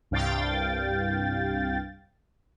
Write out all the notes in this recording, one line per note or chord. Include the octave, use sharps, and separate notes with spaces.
C2 G2 F5 G5 A6